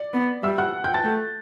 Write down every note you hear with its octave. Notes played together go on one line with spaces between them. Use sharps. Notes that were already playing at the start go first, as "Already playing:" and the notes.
Already playing: D5
B3
G3 E5 E6
F#5 F#6
G5 G6
A5 A6
A3